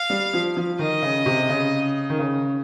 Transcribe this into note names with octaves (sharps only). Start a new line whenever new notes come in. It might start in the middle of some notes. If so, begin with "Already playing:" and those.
Already playing: F5
G3
F3
F3
D#3 D#5
C#3
C3
C#3
D#3
C#3